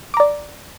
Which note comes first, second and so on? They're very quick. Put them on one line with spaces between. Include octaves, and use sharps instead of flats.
D6 A#5 D5